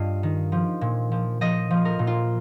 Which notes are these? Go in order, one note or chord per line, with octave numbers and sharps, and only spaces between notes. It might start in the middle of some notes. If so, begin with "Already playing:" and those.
Already playing: G2 F4 D#5 F5
D#3
F3
A#2
F3
F3 D#5
F3
A#4
A#2
F4